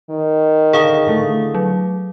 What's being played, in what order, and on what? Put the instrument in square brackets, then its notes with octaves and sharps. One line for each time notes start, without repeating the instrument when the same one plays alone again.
[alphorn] D#3
[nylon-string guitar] D3 A5 [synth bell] G#4 F5 D#6
[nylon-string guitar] D3 E3 A3
[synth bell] F#3